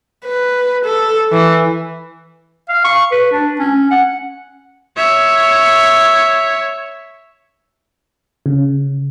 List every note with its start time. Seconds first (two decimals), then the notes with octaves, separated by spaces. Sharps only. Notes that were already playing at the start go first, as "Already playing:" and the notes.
0.25 B4
0.84 A4
1.32 E3
2.69 F5
2.84 C#6
3.12 B4
3.32 D4
3.59 C#4
3.91 F#5
4.97 C#5 E5
8.46 C#3